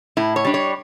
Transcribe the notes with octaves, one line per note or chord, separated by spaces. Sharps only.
A2 E4
C#5
G3 D4
C#5